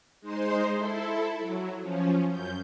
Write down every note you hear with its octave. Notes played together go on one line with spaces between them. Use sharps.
G#3 D#4 C5 C6
E4 A4
F#3
F3 C#4
F#2 G6